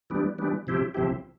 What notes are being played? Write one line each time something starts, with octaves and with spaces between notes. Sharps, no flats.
E3 G3 B3 D4
E3 G3 B3 D4
C3 F3 C4 E4 G4
C3 F3 C4 E4 G4